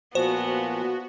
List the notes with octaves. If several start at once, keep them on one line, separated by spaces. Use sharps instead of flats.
A#2 F3 B3 F#4 C5